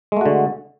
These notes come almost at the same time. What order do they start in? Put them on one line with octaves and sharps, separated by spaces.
G#3 A3 F#4 D3